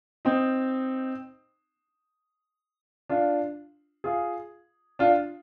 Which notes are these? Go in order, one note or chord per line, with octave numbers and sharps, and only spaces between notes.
C4 D#4
D4 F4
F4 G#4
D4 F4